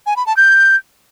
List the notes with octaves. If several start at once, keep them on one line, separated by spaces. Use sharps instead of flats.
G#5
B5
A5
G6